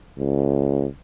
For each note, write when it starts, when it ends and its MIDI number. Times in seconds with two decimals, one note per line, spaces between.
0.18 0.86 37